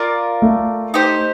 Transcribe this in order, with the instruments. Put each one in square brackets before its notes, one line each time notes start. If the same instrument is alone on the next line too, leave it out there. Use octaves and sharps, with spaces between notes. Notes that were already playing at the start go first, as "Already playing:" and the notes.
Already playing: [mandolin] F4 A#4 D5
[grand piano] A3
[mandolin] D#4 G4 C5